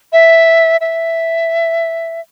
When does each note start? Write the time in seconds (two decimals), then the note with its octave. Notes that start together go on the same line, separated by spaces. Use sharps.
0.13 E5
0.81 E5